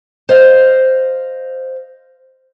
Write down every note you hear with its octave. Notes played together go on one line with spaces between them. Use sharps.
C5 D#5 F5